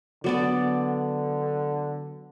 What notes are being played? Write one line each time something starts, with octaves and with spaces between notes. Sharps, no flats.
D3 F#3 B3 D5